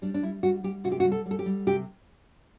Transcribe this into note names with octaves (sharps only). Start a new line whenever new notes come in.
G3 D4
D4
G3 E4
G3 F#4
G3 G4
C3 F#4
G4
F#4
G3
A4
G3
A4
G4
G3
C3 G4